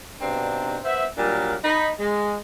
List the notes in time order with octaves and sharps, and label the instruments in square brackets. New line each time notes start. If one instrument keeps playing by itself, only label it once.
[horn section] G2 B2 C4 D4 D#4 A#5
B3 C5 E5
A#2 F#3 G3 D4 A#4
D#4 B5
G#3